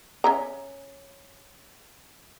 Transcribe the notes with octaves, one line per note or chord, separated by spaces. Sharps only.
C#4 E5 A#5